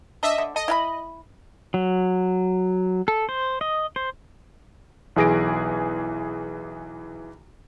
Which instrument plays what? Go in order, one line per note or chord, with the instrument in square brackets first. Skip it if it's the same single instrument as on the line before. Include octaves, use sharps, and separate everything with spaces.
[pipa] D4 [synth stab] D#5 E5
[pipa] D3
[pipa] A4 [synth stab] D#5
[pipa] E4 F5 B5
[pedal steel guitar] F#3
A4
C5
D#5
C5
[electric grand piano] B1 E3 G#4 A#6 D7